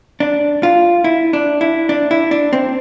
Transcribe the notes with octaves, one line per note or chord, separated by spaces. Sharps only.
D4
F4
E4
D4
E4
D4
E4
D4
C4